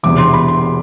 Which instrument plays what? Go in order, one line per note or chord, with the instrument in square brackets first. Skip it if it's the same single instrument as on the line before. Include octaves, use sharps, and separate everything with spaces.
[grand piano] E1 E2 C3 [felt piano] D6
[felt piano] C6
B5
C6